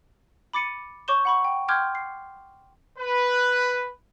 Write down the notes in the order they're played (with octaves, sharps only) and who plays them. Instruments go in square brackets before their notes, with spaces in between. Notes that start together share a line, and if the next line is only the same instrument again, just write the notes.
[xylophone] B5 D6 A6 C#7 D#7
C#5 C#6 D6 G6 E7 G7
F#5 B5 C#6
G5
G5 C6 D6 F6 G6 G#6
C7
[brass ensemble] B4